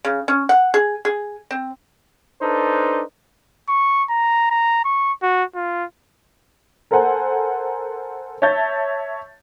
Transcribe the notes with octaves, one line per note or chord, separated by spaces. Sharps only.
C#3
C#4
F#5
G#4
G#4
C4
D4 D#4 A4 B4 C5
C#6
A#5
A#5
C#6
F#4
F4
A4 A#4 C5 F#5 G#5
C#5 E5 A5 G6 A6